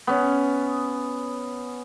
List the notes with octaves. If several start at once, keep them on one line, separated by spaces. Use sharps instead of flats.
B3 C#4